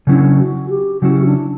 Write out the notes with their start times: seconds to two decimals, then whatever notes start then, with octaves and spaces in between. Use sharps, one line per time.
0.07 C#3 F#3 C#4 D4 E4
0.39 F#4
0.70 G4
1.01 C#3 F#3 C#4 E4 F#4
1.25 D4